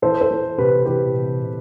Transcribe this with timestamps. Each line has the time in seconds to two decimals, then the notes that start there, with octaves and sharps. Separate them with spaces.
0.02 E3 A4 C5
0.21 A4 C5
0.31 E3
0.58 C3 G4 B4
0.85 E3 G4 B4
1.14 C3
1.42 C3